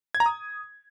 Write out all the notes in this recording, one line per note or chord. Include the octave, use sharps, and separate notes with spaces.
G#6
A#5
D#6